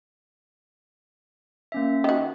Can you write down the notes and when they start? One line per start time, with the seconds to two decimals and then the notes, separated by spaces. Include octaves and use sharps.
1.72 A#3 C#4 E5
2.04 D#3 F#4